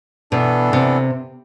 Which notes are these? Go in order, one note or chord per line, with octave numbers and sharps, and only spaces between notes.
B2 E3 B3 D4 A4
C3